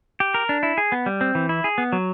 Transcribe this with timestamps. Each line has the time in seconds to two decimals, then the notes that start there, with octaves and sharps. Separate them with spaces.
0.20 G4
0.34 A#4
0.49 D4
0.63 E4
0.78 G#4
0.92 B3
1.06 G3
1.21 C4
1.35 E3
1.49 E4
1.64 G#4
1.78 B3
1.93 F#3